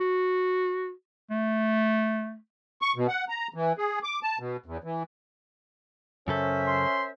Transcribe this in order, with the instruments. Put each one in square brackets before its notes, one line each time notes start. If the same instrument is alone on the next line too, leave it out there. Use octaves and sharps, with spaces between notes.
[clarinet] F#4
A3
[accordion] C#6
B2
F#5
A#5
E3
G#4
D6
A5
B2
E2
E3
[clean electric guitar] F#2 C#3 A4 [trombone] C#4 [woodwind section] A#4 C5 E5
[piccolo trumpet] C6